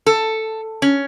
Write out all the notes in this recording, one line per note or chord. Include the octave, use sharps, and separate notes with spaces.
A4
C#4